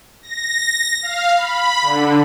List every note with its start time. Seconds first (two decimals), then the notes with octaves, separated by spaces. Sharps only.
0.22 A#6
1.03 F5
1.36 B5
1.82 D3